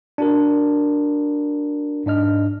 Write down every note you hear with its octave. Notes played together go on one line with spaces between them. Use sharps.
D4 F#4 A#4
G#2 D4 D#5 F6